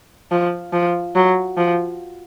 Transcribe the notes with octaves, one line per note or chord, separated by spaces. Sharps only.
F3
F3
F#3
F3